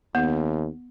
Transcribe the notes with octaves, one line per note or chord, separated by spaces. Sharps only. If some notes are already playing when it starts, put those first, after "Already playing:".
D#2 B3